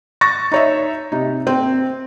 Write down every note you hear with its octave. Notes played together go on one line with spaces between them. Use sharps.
C#6 A6 A#6
D#4 C#5 E5
C3 D#4
C4